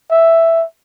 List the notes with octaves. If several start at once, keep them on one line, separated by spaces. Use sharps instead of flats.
E5